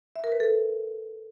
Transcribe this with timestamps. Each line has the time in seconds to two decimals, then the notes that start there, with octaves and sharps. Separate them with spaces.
0.16 E5
0.24 A#4
0.32 B4
0.40 A4